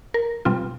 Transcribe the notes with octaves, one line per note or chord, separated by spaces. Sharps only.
A#4
B2 G3 C4 F4